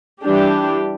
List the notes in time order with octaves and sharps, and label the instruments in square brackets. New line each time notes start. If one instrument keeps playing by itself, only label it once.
[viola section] E3 G3 D4 G4